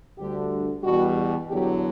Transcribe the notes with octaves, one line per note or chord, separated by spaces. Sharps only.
D2 D3 G3 G4
E2 B2 G3 F#4
E2 D3 F#3 G4